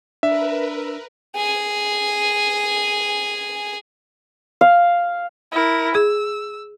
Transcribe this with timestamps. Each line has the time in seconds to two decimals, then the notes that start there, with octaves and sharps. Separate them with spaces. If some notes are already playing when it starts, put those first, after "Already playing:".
0.23 D4 A#4 B4 E5
1.36 G#4 G#5
4.61 F5
5.52 E4 A#4
5.95 G#4 E6